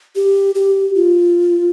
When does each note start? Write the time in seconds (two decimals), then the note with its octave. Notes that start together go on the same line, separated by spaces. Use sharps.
0.16 G4
0.55 G4
0.95 F4